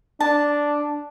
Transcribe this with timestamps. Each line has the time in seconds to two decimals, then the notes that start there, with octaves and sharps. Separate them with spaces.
0.20 D4 A5